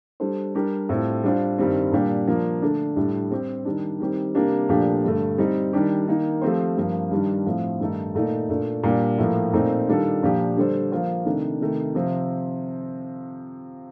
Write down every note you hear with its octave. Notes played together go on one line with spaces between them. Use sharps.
G3 D4 A4 C5
G3 D4 G4 A#4
A2 G3 C4 F4 A4
G3 D4 F4 C5
G2 D#3 G3 C4
A#2 G3 D4 G4
F3 A#3 D4 F4
D3 A3 D4
A2 G3 D4
G3 C4 G4
D#3 G3 D4
D#3 G3 C4 G4
C3 G3 A#3 D4 G4
A#2 F3 A3 D4 G4
G2 D3 A3
G3 C4 D#4
D#3 G3 D4 G4
D#3 A#3 D#4
F3 A3 C4 G4 C5
G2 F3 A#3
G2 D#3 G3 D4
A2 F3 A3 C4 F4
G2 D#3 A3 D#4 A4
A#2 A3 D#4
A#2 A3 D4 F4
A#2 G3 D4 G4
A2 F3 A#3
A#2 A3 C4 D#4
D#3 G3 D4 F4 A4
A#2 F3 A#3 D4 G4
D3 G3 D4 A4 C5
F3 A#3 F4 C5
C3 D#3 A3 D4
C3 D#3 A3
C3 F3 C4